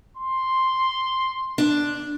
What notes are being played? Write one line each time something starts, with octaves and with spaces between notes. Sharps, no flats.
C6
D4